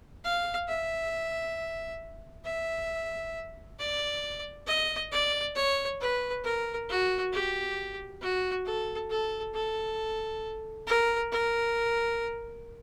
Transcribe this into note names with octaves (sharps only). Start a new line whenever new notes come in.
F5
E5
E5
D5
D#5
D5
C#5
B4
A#4
F#4
G4
F#4
A4
A4
A4
A#4
A#4